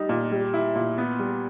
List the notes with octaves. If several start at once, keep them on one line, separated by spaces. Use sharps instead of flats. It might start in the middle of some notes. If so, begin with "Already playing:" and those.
Already playing: G3 D#4
A#2
G3
E4
A#2
B3
G3